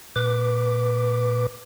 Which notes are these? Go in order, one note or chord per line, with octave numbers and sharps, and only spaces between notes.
A#2 B4 D6